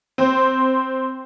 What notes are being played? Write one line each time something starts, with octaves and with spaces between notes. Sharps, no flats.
C4 C5